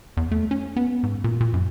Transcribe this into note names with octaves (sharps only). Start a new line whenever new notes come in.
E2
A3
C#4
B3
G#2
A#2
A#2
F#2